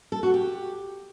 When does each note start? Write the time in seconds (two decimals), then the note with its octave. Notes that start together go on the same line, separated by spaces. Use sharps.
0.12 A4
0.23 F#4
0.34 G4